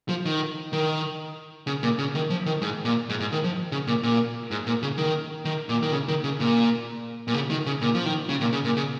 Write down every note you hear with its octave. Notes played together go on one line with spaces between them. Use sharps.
F3
D#3
D#3
C#3
A#2
C#3
D#3
F3
D#3
G#2
A#2
G#2
G#2
D#3
F3
C#3
A#2
A#2
G#2
A#2
C#3
D#3
D#3
A#2
D#3
C#3
D#3
C#3
A#2
A#2
C#3
D#3
C#3
A#2
F3
D#3
C#3
A#2
C#3
A#2
C#3